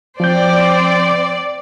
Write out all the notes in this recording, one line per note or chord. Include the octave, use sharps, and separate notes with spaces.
F3 C4 C5 D5 G6